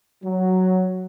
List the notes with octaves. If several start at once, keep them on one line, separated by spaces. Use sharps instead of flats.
F#3